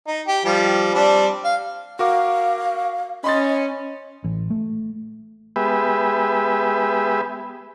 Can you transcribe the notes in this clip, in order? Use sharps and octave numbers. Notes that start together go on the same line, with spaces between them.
D#4
G4
F3 G3
G3 C4 D4
F5
F#4 A#4 F5 D6
C#4 D#5 B5 C6 A6
A1
A3
G#3 B3 G4 B4 E5